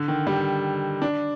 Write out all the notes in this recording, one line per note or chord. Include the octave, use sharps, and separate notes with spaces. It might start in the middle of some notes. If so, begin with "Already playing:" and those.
Already playing: D3
D#3
G3
D4